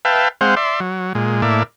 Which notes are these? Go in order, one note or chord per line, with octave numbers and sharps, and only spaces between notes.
B4 E5 F5 G5 A5
G#3 C4 C5 F5 F#5
D5 E5 C6
F#3
A#2 G#3
A2 A#3 D5 E5